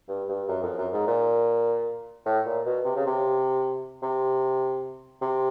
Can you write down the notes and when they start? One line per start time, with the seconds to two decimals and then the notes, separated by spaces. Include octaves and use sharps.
0.08 G2
0.29 G2
0.48 F#2
0.63 F2
0.77 F#2
0.93 G#2
1.07 A#2
2.25 A2
2.45 A#2
2.65 B2
2.85 C3
2.96 C#3
3.06 C3
4.02 C3
5.21 C3